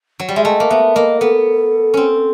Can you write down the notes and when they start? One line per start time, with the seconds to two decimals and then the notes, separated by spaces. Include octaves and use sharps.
0.20 F#3
0.29 G3
0.36 G#3 E5
0.44 A3 D#5
0.60 A#3
0.70 B3 E5
0.95 A#3 D#5
1.20 B3 A4
1.94 C4 C#4